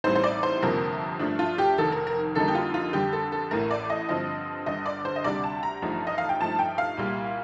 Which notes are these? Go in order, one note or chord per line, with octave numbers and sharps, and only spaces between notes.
A1 A2 G3 C4 D#4 C5
C5
D5
C5
G1 F2 C3 F3 A#3 A#4
G2 F3 A3 D4
F4
G4
F1 F2 D#3 A4
A#4
A#4
F2 D3 G3 A#3 D#4 A4
G4
F4
F4
F2 D3 G3 G4
A4
A4
A1 A2 A3 A#4
D5
D#5
G2 D3 F3 C4 D#5
G1 G2 D3 D#5
D5
C5
D#5
D2 C3 G3 D4 D5
A5
A#5
A1 G2 F3 A3 D#4
D#5
F5
G5
G2 F3 A3 D#4 A5
G5
F5
C2 A#2 G3